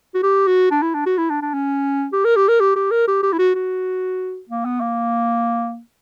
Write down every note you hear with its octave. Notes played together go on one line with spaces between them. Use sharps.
F#4
G4
F#4
D4
E4
D4
F#4
E4
D4
D4
C#4
G4
A#4
G4
A#4
G4
G4
A#4
G4
G4
E4
F#4
F#4
A#3
B3
A#3